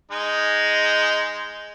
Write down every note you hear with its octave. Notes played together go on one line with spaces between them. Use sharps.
G#3 D#4